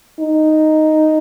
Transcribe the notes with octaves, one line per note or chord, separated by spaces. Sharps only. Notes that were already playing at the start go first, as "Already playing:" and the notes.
D#4